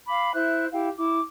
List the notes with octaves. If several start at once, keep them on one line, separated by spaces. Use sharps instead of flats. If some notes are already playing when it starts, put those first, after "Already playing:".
F5 B5 D6
E4 C5 E5 F#6
E4 G4 F5 G5
E4 D6